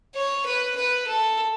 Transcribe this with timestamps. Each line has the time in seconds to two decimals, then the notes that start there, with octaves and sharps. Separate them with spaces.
0.15 C#5
0.46 B4
0.76 B4
1.07 A4